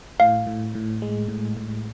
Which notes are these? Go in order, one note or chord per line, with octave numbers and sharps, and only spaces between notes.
A2 F5
A2
A2
G#3
A2
A2